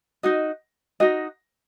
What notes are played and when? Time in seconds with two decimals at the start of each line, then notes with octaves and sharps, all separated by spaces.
0.23 D#4 F#4 D#5
1.00 D#4 F#4 D#5